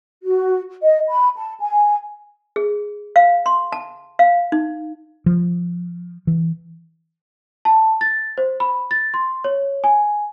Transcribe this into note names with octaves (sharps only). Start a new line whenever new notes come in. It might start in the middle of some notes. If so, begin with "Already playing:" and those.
F#4
D#5
B5
A5
G#5
G#4
F5
C6
A5
F5
D#4
F3
E3
A5
A6
C5
B5
A6
C6
C#5
G#5